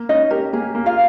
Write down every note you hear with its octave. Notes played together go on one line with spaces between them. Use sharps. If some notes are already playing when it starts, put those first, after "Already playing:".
Already playing: A#3
C#4 D#4 D#5
G4 A#4
A#3 G#4
A#3
F4 F5